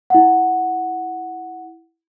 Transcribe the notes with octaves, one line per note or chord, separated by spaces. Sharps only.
E4 F#5